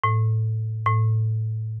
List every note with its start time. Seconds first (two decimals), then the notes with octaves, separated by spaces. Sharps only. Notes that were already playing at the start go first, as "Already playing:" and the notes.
0.04 A2
0.86 A2